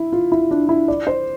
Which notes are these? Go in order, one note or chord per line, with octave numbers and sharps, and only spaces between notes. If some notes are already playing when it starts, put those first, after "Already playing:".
Already playing: E4
F4
E4
D4
E4
D5
C5